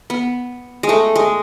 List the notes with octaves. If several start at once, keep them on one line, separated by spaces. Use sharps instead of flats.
B3
G#3
A3
G#3